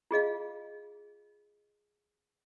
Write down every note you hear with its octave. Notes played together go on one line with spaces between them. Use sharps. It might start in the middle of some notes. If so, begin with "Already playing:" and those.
F4 G#4 D#5 F5